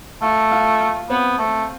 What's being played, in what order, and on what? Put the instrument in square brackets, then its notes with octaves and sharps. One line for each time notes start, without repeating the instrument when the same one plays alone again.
[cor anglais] A3 [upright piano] F4
[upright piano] F4
F4
[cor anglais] B3 [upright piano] C4
[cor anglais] A3 [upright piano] C4